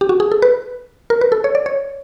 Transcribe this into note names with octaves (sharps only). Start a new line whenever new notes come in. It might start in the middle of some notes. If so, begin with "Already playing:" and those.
G4
F#4
G#4
A4
B4
A#4
B4
A4
C#5
D5
C#5